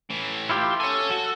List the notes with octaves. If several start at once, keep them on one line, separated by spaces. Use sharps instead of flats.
A2 E3
E4 F4 G4
A4 C#5 G#5
F#4